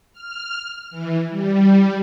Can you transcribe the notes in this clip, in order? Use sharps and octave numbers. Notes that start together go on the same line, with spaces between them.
F6
E3
G3